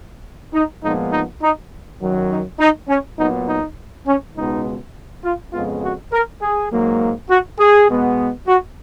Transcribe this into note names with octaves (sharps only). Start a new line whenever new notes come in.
D#4
A#2 F3 G#3 B3 D#4
D#4
D#4
F#2 D#3 F#3
D#4
D#4
C#4
A#2 F#3 B3 D#4
D#4
C#4
C#2 B2 G#3 B3 D#4
F4
F2 C#3 G#3 B3 F4
F#4
A#4
G#4
G#2 F#3 A#3
F#4
G#4
B2 G#3 B3
F#4